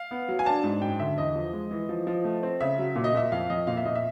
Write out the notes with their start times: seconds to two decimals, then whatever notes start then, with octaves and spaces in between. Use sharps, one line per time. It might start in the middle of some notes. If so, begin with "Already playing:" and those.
Already playing: F5
0.11 B3
0.28 F#3
0.39 G#5
0.46 D4 A5
0.64 G#2
0.82 F#2 G5
1.00 D3 E5
1.17 E2 D#5
1.36 F3
1.53 G#3
1.71 E3
1.89 F3
2.07 F3
2.24 A3
2.43 C4
2.61 C#3 E5
2.79 F#3
2.96 A#2
3.04 D#5
3.14 A#2 E5
3.32 F2 F5
3.50 F2 D#5
3.67 A#2 F5
3.77 E5
3.85 A#2 D#5
3.95 E5